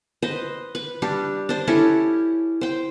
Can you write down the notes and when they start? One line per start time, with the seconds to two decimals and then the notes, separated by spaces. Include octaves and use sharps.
0.22 B4 C5 D#5
0.75 B4
1.02 G3 D4 G4
1.49 D4 C5
1.67 C#4 E4 G4 A4
2.61 C5 G5